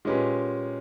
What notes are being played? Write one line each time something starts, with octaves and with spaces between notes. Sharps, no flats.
A#2 G#3 C#4 G4 B4